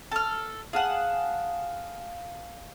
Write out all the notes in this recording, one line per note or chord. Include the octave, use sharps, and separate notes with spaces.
A4 F6
G#4 F5 F#5 A5